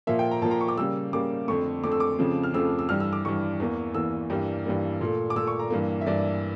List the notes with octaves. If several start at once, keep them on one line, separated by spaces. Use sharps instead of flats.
A#2 F3 A#3 E5
G5
A#5
A#2 F3 A#3 A5
A#5
C#6
D6
C#3 G3 A#3 E6
C#3 G3 A#3 D6
F2 D3 A3 C#6
F2 D3 A3 D6
E6
D6
F2 C#3 F3 A3
F6
F2 C#3 F3 A3 E6
E6
G2 E3 G3 F6
E6
D6
G2 E3 G3 C#6
E2 E3 A#3
E2 E3 A#3 E6
G2 E3 G3 A#3
G2 E3 G3 A#3
A#2 A3
D6
A#2 A3 E6
C#6
A#5
G2 E3 A#3
E5
G2 E3 A#3 D5